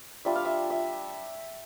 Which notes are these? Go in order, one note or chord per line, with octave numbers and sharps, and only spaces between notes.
G3 D4 F4 E5
F5
E5
E5